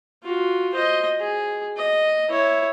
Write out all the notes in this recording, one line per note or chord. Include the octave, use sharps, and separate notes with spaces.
F4 F#4
C5 D#5
G#4
D#5
E4 C#5